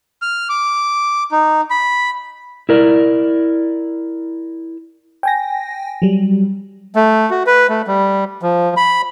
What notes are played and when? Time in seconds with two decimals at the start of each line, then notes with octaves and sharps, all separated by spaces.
0.22 F6
0.49 D6
1.32 D#4
1.70 B5
2.69 E4 A#4 D5
5.23 G5 G#5 A#6
6.02 F#3 G3
6.96 A3
7.30 F#4
7.46 B4
7.69 A3
7.87 G3
8.42 F3
8.77 B5